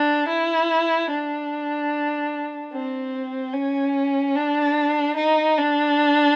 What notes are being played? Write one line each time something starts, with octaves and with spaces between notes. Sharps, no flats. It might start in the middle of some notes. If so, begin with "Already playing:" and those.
Already playing: D4
E4
D4
C4
C#4
D4
D#4
D4